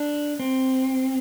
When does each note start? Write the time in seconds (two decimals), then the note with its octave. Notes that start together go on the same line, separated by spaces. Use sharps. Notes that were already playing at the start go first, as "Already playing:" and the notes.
Already playing: D4
0.39 C4